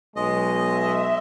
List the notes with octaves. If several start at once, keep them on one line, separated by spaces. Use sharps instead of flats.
B1 G#3 D#5
E5